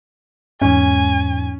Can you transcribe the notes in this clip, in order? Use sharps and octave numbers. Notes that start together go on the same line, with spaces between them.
E2 G#2 C#4 G#5